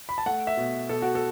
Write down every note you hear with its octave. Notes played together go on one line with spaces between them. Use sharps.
B5
A5
A3 F#5
E5
B2
B2 A4
F#4
A4